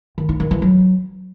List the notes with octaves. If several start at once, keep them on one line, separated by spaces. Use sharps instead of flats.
D#3
D#4
D#3
E3
F#3